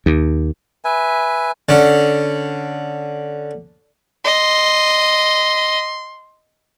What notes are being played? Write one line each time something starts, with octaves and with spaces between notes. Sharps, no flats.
D#2
B4 E5 G#5
D3 C#4
D#5 C6